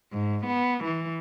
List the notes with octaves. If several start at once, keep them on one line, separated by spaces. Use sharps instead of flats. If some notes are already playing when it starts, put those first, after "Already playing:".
G#2
B3
E3